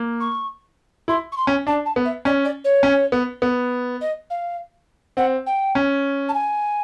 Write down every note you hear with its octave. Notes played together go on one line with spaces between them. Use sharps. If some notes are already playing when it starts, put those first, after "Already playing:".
Already playing: A#3
C#6
E4 C6
C#6
C6
C#4
D4 A5
A5
B3
E5
C#4 D5
D5
C#5
C#4
B3
B3
D#5
F5
C4 F#5
G5
C#4
A5
G#5